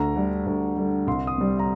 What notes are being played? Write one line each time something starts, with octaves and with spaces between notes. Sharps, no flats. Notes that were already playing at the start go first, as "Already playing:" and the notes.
Already playing: D2 A#5
D3 G3
D2
D3 G3
C2 C6
D#6
C3 G3
A#5